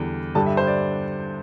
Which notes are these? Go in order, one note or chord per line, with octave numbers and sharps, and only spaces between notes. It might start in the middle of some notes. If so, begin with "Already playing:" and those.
Already playing: E2 D3 G3
G2 D3 G3 A5
E5
C5
D5